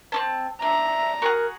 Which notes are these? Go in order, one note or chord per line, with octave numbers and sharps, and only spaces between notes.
C4 C#4 A5
D4 E5 A#5
F#4 G#4 A#4 F#5